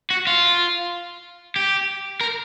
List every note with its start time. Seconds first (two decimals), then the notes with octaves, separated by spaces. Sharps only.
0.10 F#4
0.27 F4
1.56 G4
2.21 A#4